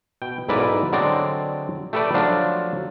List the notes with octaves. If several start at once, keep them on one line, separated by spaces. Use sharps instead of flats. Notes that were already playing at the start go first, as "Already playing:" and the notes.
B2 G5
B1 G#2 E4 A#4 B4 D5
D3 F#3 G#3 C4 D5
A3 G4 A4 B4 D5
F3 F#3 A3 D4 F4